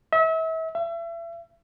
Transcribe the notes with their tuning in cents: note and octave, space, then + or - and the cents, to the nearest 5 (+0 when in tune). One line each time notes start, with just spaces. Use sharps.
E5 -35
E5 +35